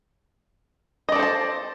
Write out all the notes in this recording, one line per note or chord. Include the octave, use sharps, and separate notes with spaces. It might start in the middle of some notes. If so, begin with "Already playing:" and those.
A4 C5 D5 D#5 A5